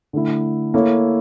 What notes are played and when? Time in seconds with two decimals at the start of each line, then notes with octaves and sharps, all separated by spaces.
0.13 D3 A3 E4
0.74 A#3 E4 A4 C#5